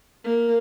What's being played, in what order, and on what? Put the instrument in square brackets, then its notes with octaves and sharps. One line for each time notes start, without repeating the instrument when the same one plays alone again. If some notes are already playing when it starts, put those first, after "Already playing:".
[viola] A#3